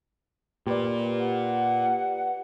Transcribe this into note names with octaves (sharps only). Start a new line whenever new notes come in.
A#2 G4 B4 D5
F#5